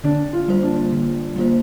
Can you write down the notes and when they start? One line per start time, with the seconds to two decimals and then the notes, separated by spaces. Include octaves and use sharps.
0.04 D3 D4
0.33 F4
0.48 G3 A#3 F4 C5
0.63 D4
0.92 D3
1.36 G3 A#3 F4 C5